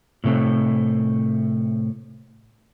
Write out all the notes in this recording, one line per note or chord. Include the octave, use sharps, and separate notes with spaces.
A2 C3 A3 C4